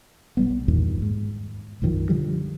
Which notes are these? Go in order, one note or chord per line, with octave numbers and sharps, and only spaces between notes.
B1 G3 B3
E2 G2 A#2 D#3
G#2
B1 F#2 D#3 F3
D3 F3 G3